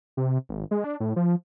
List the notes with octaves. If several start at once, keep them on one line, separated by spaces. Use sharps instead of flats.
C3
G#1
G#3
D4
A2
F3